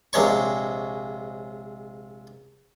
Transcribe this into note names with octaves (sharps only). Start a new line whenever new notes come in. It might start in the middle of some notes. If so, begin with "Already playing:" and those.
A#1 C3 G#3 C#5 C#6